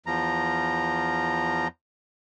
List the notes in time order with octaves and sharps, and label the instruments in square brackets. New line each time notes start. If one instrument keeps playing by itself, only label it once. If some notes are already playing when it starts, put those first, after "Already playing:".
[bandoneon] E2 F3 A#5